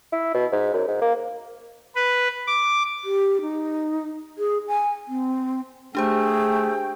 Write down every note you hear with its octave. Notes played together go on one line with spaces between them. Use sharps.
E4
B2
G#2
F#2
G#2
A#3
B4
D6
G4
D#4
G#4
G#5
C4
A3 D4 G4 G#4 C5 G5